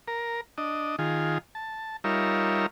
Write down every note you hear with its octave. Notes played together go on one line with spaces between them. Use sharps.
A#4
D4 D#5
D#3 F4 G#4
A5
G3 D#4 F4 A#4 C#5 E5